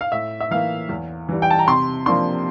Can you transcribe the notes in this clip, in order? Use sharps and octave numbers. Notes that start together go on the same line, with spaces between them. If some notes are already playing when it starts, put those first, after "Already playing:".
F5
A2 E5
E5
E3 A#3 F5
E2
E3 G3
G5
A5
A#5
C3 C6
F3 A#3 D4 C6